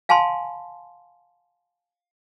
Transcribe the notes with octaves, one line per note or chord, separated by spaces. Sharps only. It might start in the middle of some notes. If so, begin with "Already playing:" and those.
F5 G#5 A5 B5 C6